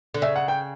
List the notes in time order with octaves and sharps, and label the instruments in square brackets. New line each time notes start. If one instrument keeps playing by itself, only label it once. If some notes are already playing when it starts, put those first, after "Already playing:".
[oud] D3
[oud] C#3 [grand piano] E5
[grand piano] F#5
G5